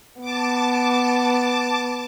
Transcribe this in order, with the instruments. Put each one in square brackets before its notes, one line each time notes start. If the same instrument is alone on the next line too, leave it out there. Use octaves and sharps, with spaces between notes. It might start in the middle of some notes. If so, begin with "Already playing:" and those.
[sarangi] B3 [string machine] A5 D6